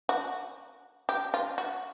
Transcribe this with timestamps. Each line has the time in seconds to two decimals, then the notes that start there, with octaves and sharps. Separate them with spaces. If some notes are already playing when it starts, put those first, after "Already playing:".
0.09 F#4
1.09 G4
1.34 F4
1.58 F#4